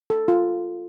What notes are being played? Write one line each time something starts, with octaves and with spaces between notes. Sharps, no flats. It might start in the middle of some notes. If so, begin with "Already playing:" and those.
A4
F4